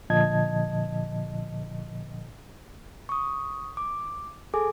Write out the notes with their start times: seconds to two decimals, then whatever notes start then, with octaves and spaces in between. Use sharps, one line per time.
0.10 A#2 D3 F3 D#5 A5 G#6
3.09 C#6 D#6
3.77 D6
4.54 G#4 A4 G#5 D6